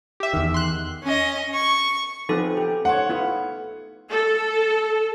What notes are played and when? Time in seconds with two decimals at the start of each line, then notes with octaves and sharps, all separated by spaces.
0.20 G4 E5
0.33 E2 D#3
0.54 C6 F#6
1.03 C#4 D#5
1.54 C#6
2.29 F3 B3 C4 D#4 A4
2.57 G4
2.85 A3 C5 C#5 F#5
3.09 B3 E4 F4
4.11 A4